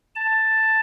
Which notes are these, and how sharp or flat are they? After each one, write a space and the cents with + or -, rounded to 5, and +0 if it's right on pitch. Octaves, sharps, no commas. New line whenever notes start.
A5 +5